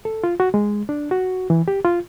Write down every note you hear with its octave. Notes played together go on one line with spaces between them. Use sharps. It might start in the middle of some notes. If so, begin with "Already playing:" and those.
A4
F4
F#4
G#3
D4
F#4
E3
G4
F4